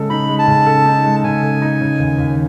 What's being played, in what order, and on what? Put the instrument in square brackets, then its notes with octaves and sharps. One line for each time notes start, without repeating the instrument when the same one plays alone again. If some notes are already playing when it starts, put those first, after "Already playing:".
Already playing: [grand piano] C#3 G#3 A4
[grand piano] D#4 [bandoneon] B5
[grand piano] G#3
[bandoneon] A5
[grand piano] C#3
A4
D#4
G#3
[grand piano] C#3 [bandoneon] G#5
[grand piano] A4
D#4
C#3
D#2
D#2